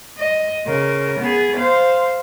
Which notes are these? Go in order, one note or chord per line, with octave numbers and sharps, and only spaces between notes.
D#5
C#3 A#4
B3 G#4
C5 F5